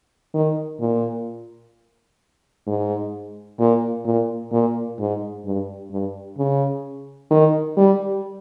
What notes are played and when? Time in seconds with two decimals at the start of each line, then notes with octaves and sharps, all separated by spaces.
0.34 D#3
0.80 A#2
2.67 G#2
3.59 A#2
4.05 A#2
4.51 A#2
4.99 G#2
5.45 G2
5.91 G2
6.38 C#3
7.31 D#3
7.77 G3